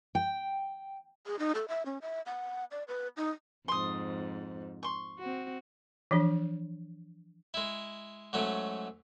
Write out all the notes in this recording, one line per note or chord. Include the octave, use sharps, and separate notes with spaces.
G5
G#4
D#4
A4
E5
C#4
E5
F#5
D5
B4
D#4
F2 G#2 C6 D#6
C6 C#6
C4 F#4
E3 F3 D4
G#3 E4
G#2 F#3 A3 C#4